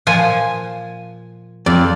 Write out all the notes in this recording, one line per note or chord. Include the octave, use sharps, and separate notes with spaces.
A#2 F3 G#5
F2 D5